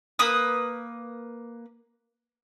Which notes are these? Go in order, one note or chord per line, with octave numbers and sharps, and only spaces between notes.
A#3 B4 D#6